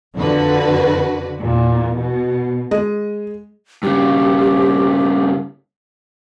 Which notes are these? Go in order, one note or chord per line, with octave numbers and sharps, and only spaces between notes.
F2 D3 F#4 B4
E2 A#2
B2
G#3 D#5
G2 C#3 G4